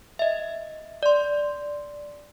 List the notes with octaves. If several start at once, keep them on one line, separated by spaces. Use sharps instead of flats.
D#5 E5
D5 C6